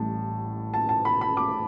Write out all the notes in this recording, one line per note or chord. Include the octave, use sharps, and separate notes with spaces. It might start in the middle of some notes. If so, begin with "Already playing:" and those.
Already playing: A1 A2 G3 A5
A5
A5
B5
B5
D6